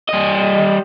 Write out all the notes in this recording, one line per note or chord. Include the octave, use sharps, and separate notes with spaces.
G3 D#5